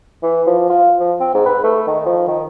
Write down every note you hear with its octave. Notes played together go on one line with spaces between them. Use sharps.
E3
F3
F4
F3
C4
G#2
B4
A3
D#3
F3
D#3